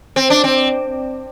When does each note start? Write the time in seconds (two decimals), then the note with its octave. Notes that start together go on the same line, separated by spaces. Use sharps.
0.16 C4
0.30 D4
0.44 C4